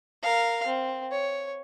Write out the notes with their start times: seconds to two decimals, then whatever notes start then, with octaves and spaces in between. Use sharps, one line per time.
0.23 A#4 F5
0.67 C4
1.12 C#5